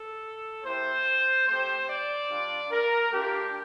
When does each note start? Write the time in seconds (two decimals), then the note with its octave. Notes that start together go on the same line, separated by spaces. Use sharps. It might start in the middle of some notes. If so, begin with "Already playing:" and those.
Already playing: A4
0.63 A#3 E4 G4 C5
1.47 A3 C4 G4 C5
1.88 D5
2.29 G3 D4 F4
2.71 A#4
3.12 A3 D4 F4 G4